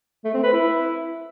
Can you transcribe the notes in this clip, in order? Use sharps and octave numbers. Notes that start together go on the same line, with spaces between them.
A3
C4
B4
E4